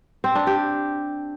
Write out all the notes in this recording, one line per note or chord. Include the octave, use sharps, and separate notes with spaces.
C4
D4
G4